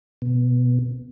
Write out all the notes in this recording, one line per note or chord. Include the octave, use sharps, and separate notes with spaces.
B2